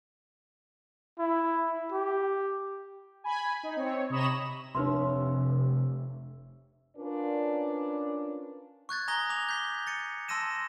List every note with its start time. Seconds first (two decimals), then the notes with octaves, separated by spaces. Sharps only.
1.19 E4
1.92 G4
3.24 G#5 B5
3.63 D#4
3.76 C4 C#5
4.10 C3 C#5 D#5 A#5 B5 E7
4.75 F1 C3 D4 B4 C#5 E5 C6
6.97 C#4 D4 F4 A#4 B4 D5
8.89 C#6 F#6 G#6 A6
9.08 G#5 A#5 D#6 G#6 A#6 G7
9.30 D6 F7
9.49 G6 B6 G7
9.87 A6 C#7 D#7
10.28 A5 C6 E6 A#6 D#7 E7